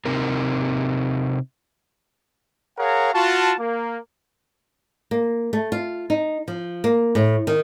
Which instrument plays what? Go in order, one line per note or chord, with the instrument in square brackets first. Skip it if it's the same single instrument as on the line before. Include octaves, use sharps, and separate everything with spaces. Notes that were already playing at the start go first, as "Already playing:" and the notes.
[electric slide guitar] C3 C4 D#4 A#4
[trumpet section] G#4 A#4 C#5 F5 F#5 A#5
F4 F#4 A5
A#3
[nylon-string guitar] A#3
A3
F4
D#4
F3
A#3
A2
D#3